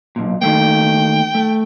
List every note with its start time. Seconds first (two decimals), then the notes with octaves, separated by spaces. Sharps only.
0.16 B1 A#2
0.42 D#3 A3 A#3 G5
1.35 A3